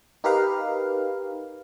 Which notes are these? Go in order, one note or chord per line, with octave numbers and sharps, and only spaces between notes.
D#4 G4 A#4 B4 F5